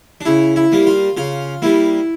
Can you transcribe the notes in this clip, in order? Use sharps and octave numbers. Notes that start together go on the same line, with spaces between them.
D4
C#3 E4
E4
G3 A#3
F4
C#3 F4
G3 A#3 E4